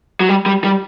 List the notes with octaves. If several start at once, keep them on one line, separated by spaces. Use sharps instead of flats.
F#3
G3
G3
G3